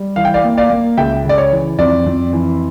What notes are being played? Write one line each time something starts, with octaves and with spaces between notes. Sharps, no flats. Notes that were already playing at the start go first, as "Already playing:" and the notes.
Already playing: G3
E3 F5
G5
D5 F5
A#3
D5 F5
A#3
C#2 E5 G5
C#3
D5
C#5
E3
F2 D5
F2
E3